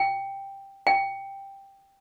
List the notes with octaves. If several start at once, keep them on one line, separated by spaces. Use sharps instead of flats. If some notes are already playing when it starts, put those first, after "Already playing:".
Already playing: G5
G5